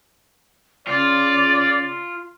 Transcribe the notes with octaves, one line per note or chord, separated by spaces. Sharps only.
C#3 F4 D5